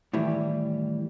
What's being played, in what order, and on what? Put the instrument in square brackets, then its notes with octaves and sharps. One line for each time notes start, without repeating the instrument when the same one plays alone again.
[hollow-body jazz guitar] A2 D#3 E3 G3